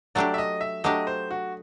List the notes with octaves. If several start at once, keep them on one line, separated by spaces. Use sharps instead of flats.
F#3 A3 D4 G4 D5
E5
D#5
E5
F#3 A3 D4 G4 D#5
C5
F#4